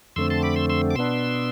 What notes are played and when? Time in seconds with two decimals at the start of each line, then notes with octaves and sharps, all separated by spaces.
0.16 F2 D3 A3 C4 C6 E6
0.30 A5 C6
0.43 B5 D6
0.56 C6 E6
0.70 C6 E6
0.91 D6
0.95 B2 B3 D4 C6 E6